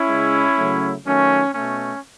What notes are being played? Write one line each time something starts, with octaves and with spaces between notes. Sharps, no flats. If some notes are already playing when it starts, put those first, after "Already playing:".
Already playing: C#4 E4
C#3 G#3
C#3 F#3 A3
D#3 F#3 A3 C#4
B2 A3 C#4